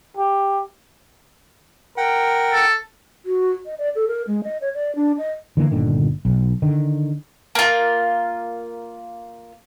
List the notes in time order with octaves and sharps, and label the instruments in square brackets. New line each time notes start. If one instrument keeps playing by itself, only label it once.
[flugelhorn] G4
[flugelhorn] A#4 [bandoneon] F#5 G5
[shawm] A4
[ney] F#4
D#5
D5
A4
A#4
G#3
D#5
C#5
D5
D4
D#5
[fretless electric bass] D3 E3 A#3
G1 A#2 D3 D#3
B1
D3 D#3
[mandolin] A#3 F4